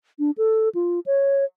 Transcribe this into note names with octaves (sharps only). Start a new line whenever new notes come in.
D4
A4
F4
C#5